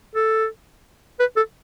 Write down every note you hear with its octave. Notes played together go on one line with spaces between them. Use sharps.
A4
B4
A4